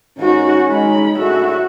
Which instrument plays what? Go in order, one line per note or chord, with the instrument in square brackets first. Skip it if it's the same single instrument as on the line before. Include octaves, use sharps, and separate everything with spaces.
[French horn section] G#2 D#3 [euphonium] C#4 [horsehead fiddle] D#4 F#4
[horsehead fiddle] G#3 B5 [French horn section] D#4
[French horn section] A2 D4 G#4 [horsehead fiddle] F#4 E5